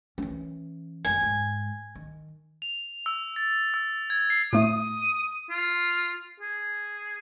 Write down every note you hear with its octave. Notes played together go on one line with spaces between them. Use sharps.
E3 C#4
F#1 D#2 G#5
G#2
D#3
F7
E6
A6
E6
G#6
C7
A2 A3 D#6
F4
G#4